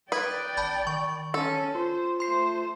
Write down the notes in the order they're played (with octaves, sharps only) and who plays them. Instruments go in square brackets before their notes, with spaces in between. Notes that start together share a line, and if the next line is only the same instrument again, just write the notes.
[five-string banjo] B4 [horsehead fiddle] D5 G5 [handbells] D#6 G#6
[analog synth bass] G#1 [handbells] A5 B5 G6
[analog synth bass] D#3 [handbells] C#6
[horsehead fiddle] C#4 [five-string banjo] A4
[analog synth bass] F4 [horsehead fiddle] C5
[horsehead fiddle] A3 C5 [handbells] C6 C7